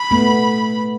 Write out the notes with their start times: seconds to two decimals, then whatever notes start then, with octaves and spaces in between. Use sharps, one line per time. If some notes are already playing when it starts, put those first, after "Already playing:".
Already playing: B5
0.11 A3 B3